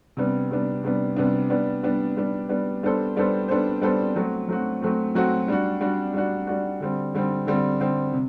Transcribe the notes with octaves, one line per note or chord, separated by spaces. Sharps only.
C3 G3 B3 D4
C3 G3 B3 D4
C3 G3 B3 D4
C3 G3 B3 D4
G3 B3 D4
G3 B3 D4
G3 B3 D4
G3 B3 D4
G3 B3 D4 A4 C5
G3 B3 D4 A4 C5
G3 B3 D4 A4 C5
G3 B3 D4 A4 C5
F#3 A3 C4 F#4
F#3 A3 C4 F#4
F#3 A3 C4 F#4
F#3 A3 C4 F#4
G3 D4 F#4
G3 D4 F#4
G3 D4 F#4
G3 D4 F#4
D3 G3 C4
D3 G3 C4
D3 G3 C4
D3 G3 C4
C3